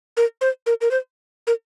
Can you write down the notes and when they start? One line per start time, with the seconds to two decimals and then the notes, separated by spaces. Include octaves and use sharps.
0.17 A#4
0.41 C5
0.66 A#4
0.81 A#4
0.91 C5
1.47 A#4